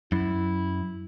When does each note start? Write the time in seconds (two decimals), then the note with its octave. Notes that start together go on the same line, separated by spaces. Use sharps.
0.12 F#2 E4